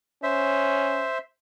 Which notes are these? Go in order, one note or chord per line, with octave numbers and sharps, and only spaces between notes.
C#4 C5 E5